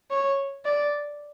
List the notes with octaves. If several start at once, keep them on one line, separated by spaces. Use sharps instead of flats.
C#5
D5